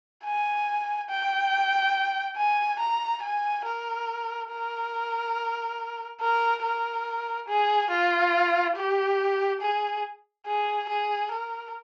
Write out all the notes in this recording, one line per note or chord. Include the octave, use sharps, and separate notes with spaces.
G#5
G5
G#5
A#5
G#5
A#4
A#4
A#4
A#4
G#4
F4
G4
G#4
G#4
G#4
A#4